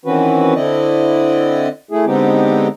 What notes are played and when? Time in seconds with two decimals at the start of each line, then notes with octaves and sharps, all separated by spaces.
0.05 D#3 E3 C4 C#4 F#4 B4
0.55 D3 C4 E4 D5 D#5
1.91 A3 E4 G#4
2.06 D3 G#3 B3 C4 D#4 G4